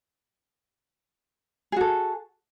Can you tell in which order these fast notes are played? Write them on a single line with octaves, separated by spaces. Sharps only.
G#4 F#4 A4